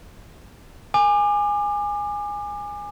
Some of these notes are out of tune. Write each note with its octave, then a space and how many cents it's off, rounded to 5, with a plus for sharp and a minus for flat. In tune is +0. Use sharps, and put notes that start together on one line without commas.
G#5 -10 D6 +30